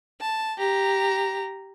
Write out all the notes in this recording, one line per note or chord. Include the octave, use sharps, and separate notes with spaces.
A5
G4 A#5